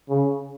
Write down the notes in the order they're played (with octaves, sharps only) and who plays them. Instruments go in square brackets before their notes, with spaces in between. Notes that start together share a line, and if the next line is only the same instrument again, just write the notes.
[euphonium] C#3